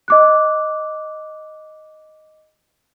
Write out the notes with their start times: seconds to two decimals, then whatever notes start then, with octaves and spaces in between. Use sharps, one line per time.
0.08 D#5 D6 F#6